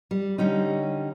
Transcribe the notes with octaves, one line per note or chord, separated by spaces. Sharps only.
G3
D3 G3 C#4 D#4